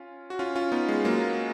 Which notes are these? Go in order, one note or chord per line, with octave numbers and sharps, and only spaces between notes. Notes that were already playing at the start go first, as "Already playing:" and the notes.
Already playing: C#4 F4
F#4
C#4 F4
C#4 F4
B3 D#4
G#3 B3
F#3 A#3